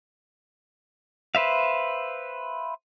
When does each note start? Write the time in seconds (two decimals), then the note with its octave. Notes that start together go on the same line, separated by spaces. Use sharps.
1.35 B4 C5 E5 F5